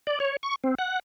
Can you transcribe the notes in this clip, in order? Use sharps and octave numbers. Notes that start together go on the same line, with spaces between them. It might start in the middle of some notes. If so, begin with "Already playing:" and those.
D5
C#5
C#6
C4
F#5